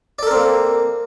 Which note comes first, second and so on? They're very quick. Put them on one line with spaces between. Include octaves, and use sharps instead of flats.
D5 A4 A#4 C4 A#3